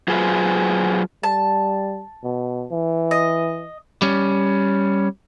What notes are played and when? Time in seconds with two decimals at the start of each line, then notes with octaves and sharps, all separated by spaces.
0.08 F#3 F4 G#4 B4 C5
1.23 G3 A5
2.24 B2
2.71 E3
3.11 D#5
4.02 G3 C#4